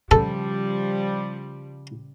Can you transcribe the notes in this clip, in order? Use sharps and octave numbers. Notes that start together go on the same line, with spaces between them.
C#3 F3 G3 A4